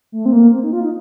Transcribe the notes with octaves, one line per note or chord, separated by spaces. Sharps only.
A3
C4
A#3
C4
D#4
F4
D#4